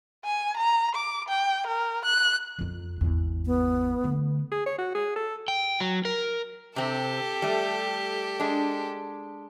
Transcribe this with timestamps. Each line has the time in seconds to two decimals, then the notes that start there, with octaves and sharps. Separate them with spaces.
0.25 G#5
0.57 A#5
0.96 D6
1.29 G5
1.67 A#4
2.06 F#6
2.59 F2 F4
3.01 G#1 E2
3.46 B3
4.04 D3 A3
4.52 G#4
4.66 C#5
4.78 F#4
4.95 G#4
5.16 A4
5.48 G5
5.80 F#3
6.05 A#4
6.76 C3 C4 G4 A4
7.42 G3 A3
8.40 G#3 D4